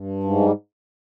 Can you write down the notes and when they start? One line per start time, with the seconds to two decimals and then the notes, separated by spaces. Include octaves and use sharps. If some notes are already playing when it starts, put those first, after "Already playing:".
Already playing: G2
0.23 G#2
0.40 G3